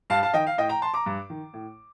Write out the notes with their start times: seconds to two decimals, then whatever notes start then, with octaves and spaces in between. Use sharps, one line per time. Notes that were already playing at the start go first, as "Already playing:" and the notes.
0.10 G2 F5 A5
0.23 F5 A5
0.34 D#3 D#5 G5
0.47 F5
0.58 A2 D#5 G5
0.69 G5 A#5
0.82 A5 C6
0.94 A#5 D6
1.06 G2
1.30 D#3
1.53 A2